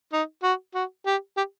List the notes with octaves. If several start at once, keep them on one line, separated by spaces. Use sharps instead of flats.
D#4
F#4
F#4
G4
G4